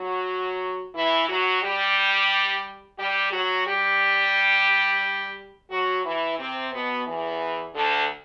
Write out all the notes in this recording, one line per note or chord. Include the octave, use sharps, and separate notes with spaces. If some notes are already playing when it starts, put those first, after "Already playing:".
Already playing: F#3 F#4
E3 E4
F#3 F#4
G3 G4
G3 G4
F#3 F#4
G3 G4
F#3 F#4
E3 E4
C3 C4
B2 B3
E2 E3
D2 D3